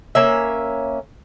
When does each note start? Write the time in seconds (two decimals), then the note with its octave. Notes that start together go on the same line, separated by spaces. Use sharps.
0.15 A#3 C#4 E5